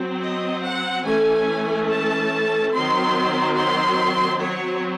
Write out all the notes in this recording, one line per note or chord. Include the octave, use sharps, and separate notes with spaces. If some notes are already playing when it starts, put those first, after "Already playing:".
Already playing: F#3 C4
D#5
F#5
E3 A3 C#4 G#5
A5
D#3 F#3 C4 C6
C6
F#3 C4 C#5